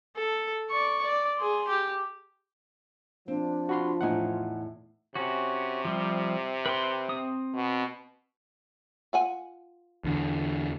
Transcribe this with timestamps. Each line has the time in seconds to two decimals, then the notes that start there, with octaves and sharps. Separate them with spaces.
0.16 A4
0.70 D5 C#6
1.02 D5
1.38 G#4 C6
1.68 G4
3.28 F3 C4 D4 F4
3.69 F#4 B5 C6
4.01 E2 A2 D#4 F#5 G#5
5.15 C3 C#4 F#4
5.85 F3 G3
6.66 B4 G5 C6
7.09 C4 D#6
7.55 B2
9.13 F4 F#5 G#5
10.04 E2 D3